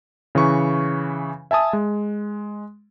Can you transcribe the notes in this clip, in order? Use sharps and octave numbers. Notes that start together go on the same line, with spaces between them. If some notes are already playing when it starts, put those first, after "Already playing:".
C#3 E3 B4 C#6
E5 G#5 A5 D#6
G#3